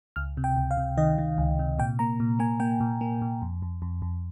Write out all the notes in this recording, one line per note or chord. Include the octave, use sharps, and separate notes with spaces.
C#2 F6
C3
G5
C#2
F5
C3
D#3 D#5
D#3
C#2
C3
A#2 G5
A#3 A#5
A#2
A#3 G#5
A#3 G5
A#2
A#3
A#2
F2
F2
F2
F2